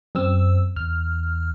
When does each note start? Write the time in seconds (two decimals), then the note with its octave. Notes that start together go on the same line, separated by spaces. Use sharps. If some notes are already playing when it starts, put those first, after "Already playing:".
0.15 F#2 C4 E6
0.76 E2 F6